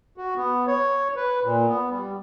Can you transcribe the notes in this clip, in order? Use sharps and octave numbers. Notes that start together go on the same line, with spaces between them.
F#4
B3
C#5
B4
A#2
B3
G3